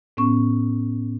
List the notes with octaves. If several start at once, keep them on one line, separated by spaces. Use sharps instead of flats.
A2 B3 C#4 C#6